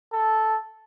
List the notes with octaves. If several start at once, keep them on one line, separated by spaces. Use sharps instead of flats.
A4